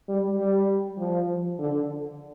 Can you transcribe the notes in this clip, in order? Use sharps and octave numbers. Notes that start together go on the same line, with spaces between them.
G3
G3
F3
D3